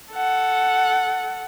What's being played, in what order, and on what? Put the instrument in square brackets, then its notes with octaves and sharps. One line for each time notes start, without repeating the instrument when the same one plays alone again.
[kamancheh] A4 F#5